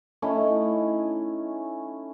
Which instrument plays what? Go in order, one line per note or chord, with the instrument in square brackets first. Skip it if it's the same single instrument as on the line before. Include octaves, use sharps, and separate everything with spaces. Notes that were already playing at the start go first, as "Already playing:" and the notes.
[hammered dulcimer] A3 C#4 D#4 E4